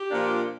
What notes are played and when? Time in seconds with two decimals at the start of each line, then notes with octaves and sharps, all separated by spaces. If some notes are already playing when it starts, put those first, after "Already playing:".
Already playing: G4
0.10 A#2 F3 A#3 D4